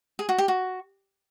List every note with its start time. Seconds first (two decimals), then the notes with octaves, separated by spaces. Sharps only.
0.19 G#4
0.29 F#4
0.38 G4
0.48 F#4